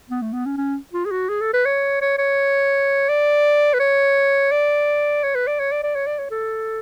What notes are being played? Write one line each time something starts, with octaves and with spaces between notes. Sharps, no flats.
B3
A3
B3
C#4
C#4
F4
G#4
F#4
G#4
A4
B4
C#5
C#5
C#5
D5
B4
C#5
D5
C#5
B4
D5
C#5
D5
D5
C#5
D5
C#5
A4